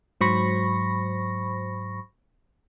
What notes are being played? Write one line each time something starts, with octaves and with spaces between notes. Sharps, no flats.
G#2 F#3 C5 B5 C#6 A#6